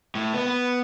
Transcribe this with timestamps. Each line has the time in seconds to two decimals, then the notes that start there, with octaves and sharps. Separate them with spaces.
0.15 A2
0.34 B3
0.47 B3